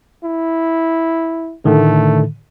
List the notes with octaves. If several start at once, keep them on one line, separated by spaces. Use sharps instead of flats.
E4
A2 D3 D#3 A3